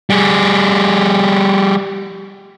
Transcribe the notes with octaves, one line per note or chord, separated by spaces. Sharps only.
G3 G#4